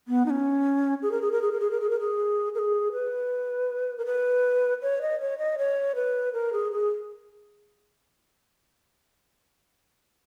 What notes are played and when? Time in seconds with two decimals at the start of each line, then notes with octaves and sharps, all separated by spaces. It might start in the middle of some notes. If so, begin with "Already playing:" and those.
0.08 B3
0.26 D#4
0.30 C#4
1.02 G#4
1.12 A#4
1.22 G#4
1.32 A#4
1.42 G#4
1.52 A#4
1.60 G#4
1.71 A#4
1.80 G#4
1.90 A#4
2.00 G#4
2.55 A#4
2.59 G#4
2.92 B4
3.98 A#4
4.06 B4
4.82 C#5
5.02 D#5
5.21 C#5
5.38 D#5
5.58 C#5
5.95 B4
6.33 A#4
6.53 G#4
6.72 G#4